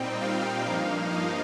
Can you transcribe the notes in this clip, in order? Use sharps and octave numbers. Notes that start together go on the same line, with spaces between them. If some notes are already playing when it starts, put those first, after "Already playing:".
Already playing: A#2 G3 C4 D#4 G5
F5
G2 F3 A#3 D#4
D#5